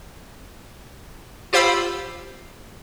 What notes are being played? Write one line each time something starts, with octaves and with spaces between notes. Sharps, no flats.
F4 G4 C5 F5 B5 E6